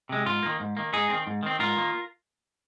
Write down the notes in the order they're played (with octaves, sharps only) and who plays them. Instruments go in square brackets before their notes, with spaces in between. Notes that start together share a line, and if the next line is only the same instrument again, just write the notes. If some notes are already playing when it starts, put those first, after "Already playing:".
[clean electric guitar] C3 G#3
G#2 F4
D#3 A#3
G#2
D#3 A#3
G#2 D#4 G#4
D#3 C4
G#2
D#3 C4
G#2 F4 A#4
D#3 A#3